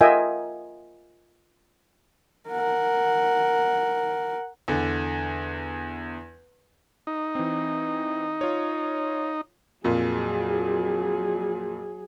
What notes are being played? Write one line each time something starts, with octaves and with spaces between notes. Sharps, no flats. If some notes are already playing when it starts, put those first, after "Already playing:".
F4 A#4 D#5 E5 G5 G#5
A#4 F#5
E2 D3
D#4
E3 C4
F4 C#5
F2 A#2 F#3 G#4